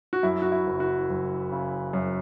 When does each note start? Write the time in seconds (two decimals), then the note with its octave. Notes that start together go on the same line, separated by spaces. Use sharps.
0.13 F#4
0.23 F#2 E4
0.42 F#4
0.52 E4
0.67 F#1
0.80 F#4
1.09 F#1
1.52 C#3
1.93 F#2